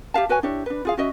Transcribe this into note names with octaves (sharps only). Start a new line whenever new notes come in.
G4 E5 F5 A5
F#4 B4 C#5 G#5
D4 E4 G4 C#5
D4 B4
F4 G#4 F5
C#4 F#4 D#5 E5